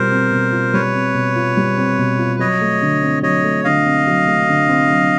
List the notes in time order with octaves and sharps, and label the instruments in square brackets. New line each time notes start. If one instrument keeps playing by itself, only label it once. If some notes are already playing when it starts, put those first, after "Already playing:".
Already playing: [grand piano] B2 G3 C4 F4 [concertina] A#4 C5
[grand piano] C4
B2
F4
[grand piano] G3 [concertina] B4 C#5
[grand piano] C4
B2
F4
G3
C4
B2
F4
[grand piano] F#3 [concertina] C#5 D#5
[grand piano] A3
D3
C4
[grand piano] F#3 [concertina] C#5 D#5
[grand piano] A3
[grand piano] D3 [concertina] D#5 F5
[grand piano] C4
F#3
A3
D3
C4
F#3